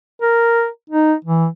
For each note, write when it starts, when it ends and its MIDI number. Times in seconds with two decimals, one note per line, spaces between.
0.21 0.67 70
0.90 1.13 63
1.24 1.47 52